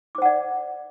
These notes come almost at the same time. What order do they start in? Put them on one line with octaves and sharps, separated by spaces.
D6 C5 F#5 D5